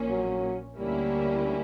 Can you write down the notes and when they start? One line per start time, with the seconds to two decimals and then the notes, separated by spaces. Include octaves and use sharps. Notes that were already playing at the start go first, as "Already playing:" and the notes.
Already playing: A#1 A#2 A#3 C#4
0.09 F#3
0.78 D2 D3 G3 A#3 C#4 E4